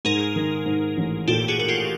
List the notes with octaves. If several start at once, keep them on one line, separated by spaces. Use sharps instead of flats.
G#2 G#4 A#4
D#3
G#2
A1
A#2 G4 A4
F#4 G#4
A#3 F#4
F4 G4